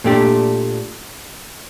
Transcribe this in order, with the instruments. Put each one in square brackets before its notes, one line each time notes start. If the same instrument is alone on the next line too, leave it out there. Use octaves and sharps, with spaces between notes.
[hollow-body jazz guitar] A#2 A3 D4 G4